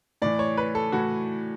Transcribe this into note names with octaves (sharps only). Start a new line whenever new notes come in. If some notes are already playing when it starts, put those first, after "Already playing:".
A2 E3 D5
C#5
B4
A4
A2 E3 F#4